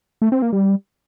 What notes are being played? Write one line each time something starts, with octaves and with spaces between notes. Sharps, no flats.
A3
C4
A#3
G3